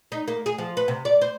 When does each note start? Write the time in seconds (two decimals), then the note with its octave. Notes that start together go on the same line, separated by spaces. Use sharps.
0.12 D#4
0.28 A#3
0.46 G#4
0.58 F3
0.77 B4
0.88 C3
1.05 D5
1.21 C5